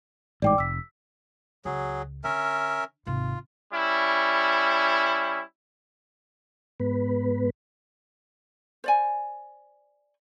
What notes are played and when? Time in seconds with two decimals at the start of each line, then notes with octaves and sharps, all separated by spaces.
0.42 A1 G#2 D5 G5 D6
0.58 F1 E6 B6
1.65 C#2 F#3 G#4
2.24 D3 C#4 A#4 E5
3.07 G#1 C3 F4
3.73 G3 C#4 E4
6.80 G#2 B3 B4
8.84 C5 D5 G#5